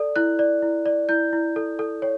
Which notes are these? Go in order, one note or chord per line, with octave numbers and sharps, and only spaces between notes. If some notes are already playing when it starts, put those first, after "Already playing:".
Already playing: A4 D5
E4 F#6
D5
E4
D5
E4 G6
E4
A4
A4
C#5